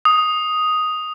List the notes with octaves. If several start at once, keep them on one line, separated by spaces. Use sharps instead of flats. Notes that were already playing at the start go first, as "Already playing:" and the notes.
D#6